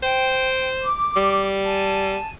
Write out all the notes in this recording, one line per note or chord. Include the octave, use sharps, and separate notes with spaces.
C5 G5
D6
G3
G#5 A5